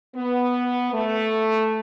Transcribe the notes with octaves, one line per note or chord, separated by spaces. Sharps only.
B3
A3